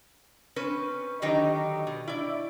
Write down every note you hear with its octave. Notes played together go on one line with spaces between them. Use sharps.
C4 C#4 B4
D3 D#3 F#3 D#4 G4 D#5
B2
E4 D5